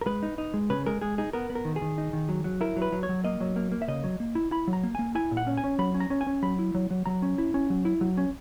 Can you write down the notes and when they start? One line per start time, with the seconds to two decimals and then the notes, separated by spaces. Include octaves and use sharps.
0.01 A#4
0.06 G#3 B4
0.23 D#4
0.38 D#4
0.54 G#3
0.70 C#3 B4
0.86 G#3 A#4
1.01 G#3 G#4
1.18 D#4 G#4
1.33 B3 A#4
1.50 B3
1.55 A#4
1.65 D#3
1.76 G#4
1.82 D#3
1.98 D#4
2.13 D#3
2.29 F#3
2.44 F#3
2.61 E4 A#4
2.77 F#3
2.82 B4
2.92 F#3
3.03 C#5
3.09 F#3
3.25 A#3 D#5
3.40 F#3
3.56 A#3
3.72 A#3
3.82 E5
3.88 C#3 D#5
4.04 F#3
4.20 A#3
4.35 E4
4.51 E4 B5
4.68 F#3
4.73 A#5
4.83 A#3
4.95 A#3 G#5
5.15 E4 G#5
5.31 A#2
5.37 F#5
5.47 C#4
5.57 G#5
5.64 C#4
5.79 F#3 B5
5.94 C#4
6.00 A#5
6.10 C#4
6.21 G#5
6.27 C#4
6.42 F#3 B5
6.59 E4
6.75 F#3
6.91 F#3
7.06 F#3 A#5
7.22 C#4
7.38 E4
7.54 C#4
7.70 F#3
7.85 E4
8.01 F#3
8.17 C#4